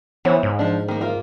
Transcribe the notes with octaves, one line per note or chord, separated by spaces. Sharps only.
E3 B3 C5 C#5
G#2
F3 D4
D#3 A#3
A#3 F4